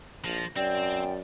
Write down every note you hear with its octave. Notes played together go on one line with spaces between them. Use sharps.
A#1 F3 A#6
F#2 C4 D5 G5